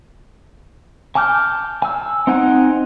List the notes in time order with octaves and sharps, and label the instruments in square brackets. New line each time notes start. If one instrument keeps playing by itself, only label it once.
[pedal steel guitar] G#5 A5 D6 F6 G6
G#5 E6
C4 D#4 C5 F#5 G#5